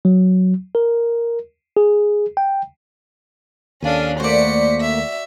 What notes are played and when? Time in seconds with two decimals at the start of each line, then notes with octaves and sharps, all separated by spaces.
0.05 F#3
0.75 A#4
1.77 G#4
2.37 G5
3.82 D#2 C#4 D4 A4 F5 D#7
4.20 A3 A#3 F#4 C5 D5 B6 C#7
4.81 E5